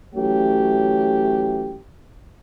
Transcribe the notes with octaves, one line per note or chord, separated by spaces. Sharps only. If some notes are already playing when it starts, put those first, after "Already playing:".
E3 F#3 A3 C#4 G4